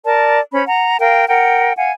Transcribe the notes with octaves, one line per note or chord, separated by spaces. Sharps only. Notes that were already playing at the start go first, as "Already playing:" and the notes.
A#4 D5 A5
C#4 C5 B5
F#5 A#5
A#4 F5 G5
A#4 F#5 G5
F5 F#5 G#5